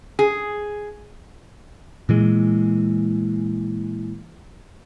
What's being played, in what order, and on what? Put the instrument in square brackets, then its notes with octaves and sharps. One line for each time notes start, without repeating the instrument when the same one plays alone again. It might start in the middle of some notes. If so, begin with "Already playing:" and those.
[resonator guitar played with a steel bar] G#4
[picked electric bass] A#2 E3 G#3